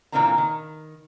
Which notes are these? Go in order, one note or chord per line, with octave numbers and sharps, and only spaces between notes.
A#2 D3 E3 A#3 C4 A#5
D#3